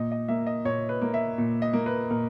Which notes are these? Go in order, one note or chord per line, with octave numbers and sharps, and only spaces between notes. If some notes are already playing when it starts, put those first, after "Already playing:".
Already playing: A#2 D#5
D#5
A#3 E5
D#5
A#2 C#5
B4
A#3
E5
A#2
D#5
A#3
B4
A#2 A#4